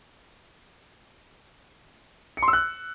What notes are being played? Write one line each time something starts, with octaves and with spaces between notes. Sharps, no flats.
C#7
C6
E6
F#6